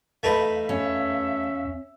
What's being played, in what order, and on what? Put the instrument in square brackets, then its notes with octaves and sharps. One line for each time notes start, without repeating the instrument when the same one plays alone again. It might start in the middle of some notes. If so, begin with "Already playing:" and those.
[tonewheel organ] E2 F5 [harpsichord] A3 D#4 B4
[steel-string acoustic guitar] C#4 [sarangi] E5